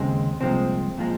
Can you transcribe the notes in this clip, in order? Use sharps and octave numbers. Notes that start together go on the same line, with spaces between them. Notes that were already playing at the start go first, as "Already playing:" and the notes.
Already playing: D#2 C#3 G#3 C4
C2 A#2 F3 G#3 C4
A#2 F3 G#3